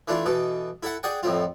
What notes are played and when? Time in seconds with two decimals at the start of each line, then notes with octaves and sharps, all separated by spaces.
0.08 E3 A3 D4 E4 F4
0.26 B2 E3 A4
0.83 E4 A4 E5 F#5
1.03 G#4 D5 F#5 G5
1.23 F2 A2 C4 F4